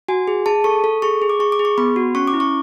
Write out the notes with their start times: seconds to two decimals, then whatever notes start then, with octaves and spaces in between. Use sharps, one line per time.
0.08 F#4 G#5
0.27 G#4
0.46 G#4 A5
0.64 A4 C#6
0.84 A4
1.02 G#4 C#6
1.22 G#4
1.29 D6
1.40 G#4 C#6
1.52 D6
1.59 G#4
1.65 C#6
1.78 B3 B5
1.96 F#4
2.15 C#4 C#6
2.27 D6
2.33 E4
2.40 C#6